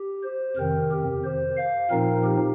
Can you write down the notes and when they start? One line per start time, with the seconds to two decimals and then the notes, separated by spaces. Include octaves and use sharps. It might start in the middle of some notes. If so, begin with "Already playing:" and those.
Already playing: G4
0.23 C5
0.57 F2 C3 D#3 C4 A#4
0.91 G4
1.24 C5
1.57 F5
1.90 A#2 F3 C4 D#4 A#4
2.24 G4